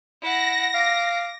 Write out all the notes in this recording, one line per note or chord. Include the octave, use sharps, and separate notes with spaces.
E4 F#5 A#6
F5 D6